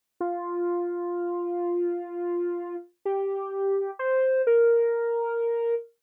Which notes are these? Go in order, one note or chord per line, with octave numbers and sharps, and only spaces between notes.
F4
G4
C5
A#4